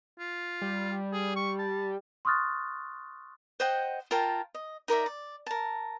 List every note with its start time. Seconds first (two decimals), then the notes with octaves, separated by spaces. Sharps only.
0.19 F4
0.61 G3
1.13 G#4
1.36 C#6
1.59 A5
2.25 C6 C#6 D#6 F6 F#6 A6
3.60 C5 D#5 F#5 G5
4.11 F4 A#4 G5 A5
4.54 D#5
4.88 D#4 A#4 D5 E5
5.06 D5
5.46 A#4 A5